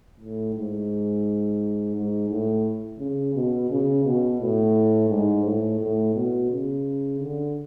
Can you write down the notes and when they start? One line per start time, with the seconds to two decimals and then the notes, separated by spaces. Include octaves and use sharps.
0.20 A2
0.55 G#2
1.95 G#2
2.30 A2
2.99 C#3
3.35 B2
3.70 C#3
4.05 B2
4.40 A2
5.09 G#2
5.44 A2
5.79 A2
6.15 B2
6.50 C#3
7.20 D3